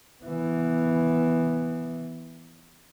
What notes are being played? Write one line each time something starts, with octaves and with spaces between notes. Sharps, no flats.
E3 B3